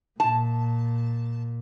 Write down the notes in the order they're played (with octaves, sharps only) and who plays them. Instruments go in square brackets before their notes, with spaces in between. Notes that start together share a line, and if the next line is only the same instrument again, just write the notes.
[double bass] A#2 [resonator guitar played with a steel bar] A5